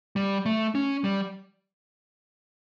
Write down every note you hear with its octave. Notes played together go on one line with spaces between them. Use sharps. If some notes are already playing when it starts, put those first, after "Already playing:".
G3
A3
C#4
G3